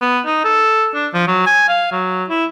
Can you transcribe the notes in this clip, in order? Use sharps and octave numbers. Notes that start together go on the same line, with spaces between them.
B3
D#4
A4
D4
F3
F#3
G#5
F5
F#3
E4